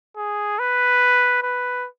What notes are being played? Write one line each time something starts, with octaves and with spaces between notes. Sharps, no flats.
G#4
B4
B4